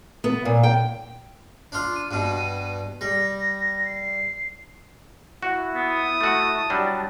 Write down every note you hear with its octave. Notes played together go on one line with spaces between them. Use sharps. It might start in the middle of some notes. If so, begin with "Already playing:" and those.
B3
A#2
G5
D4 F4
D#7
G2 B2 D#7
G3 A#6
C7
E4 F#4
B3 D#6
A3 F#4 A5
F#3 G3 D4